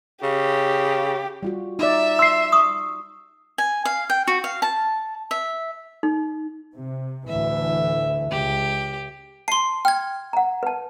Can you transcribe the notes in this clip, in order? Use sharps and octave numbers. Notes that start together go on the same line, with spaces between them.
C#3 G4
G3 F4 F#4
D#4 D5 E5
C6 E6 C7
C#6 D#6
G#5
F5
G5
F#4
F5
A5
E5
D#4
C3
D2 A2 E3 E5
C#2 G4
A5 C6 C7
G5 F6 G#6
F#5 A#5
B4 A5